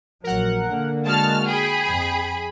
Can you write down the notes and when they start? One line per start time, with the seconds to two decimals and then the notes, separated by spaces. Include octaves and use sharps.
0.24 A#1 F#3 A#4 F#5
0.64 D3 A#3
1.05 G#3 F#4 A5 F6
1.47 G#4 G5 B5
1.85 F2